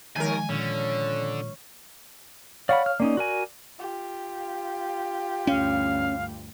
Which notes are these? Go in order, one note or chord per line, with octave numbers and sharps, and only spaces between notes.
D#2 D#3 F3 G#3 A#4 G#5
A#2 D3 C#4
C#5 D5 F5 F#5 B5
F6
A#3 C#4 D#4 D5
F#4 A#4 G#5
F4 G4
D2 G2 C#4 F5